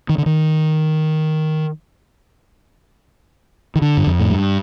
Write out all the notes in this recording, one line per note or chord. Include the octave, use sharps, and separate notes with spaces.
D#3
D3
D#3
D#3
D3
G2
F2
A2
G2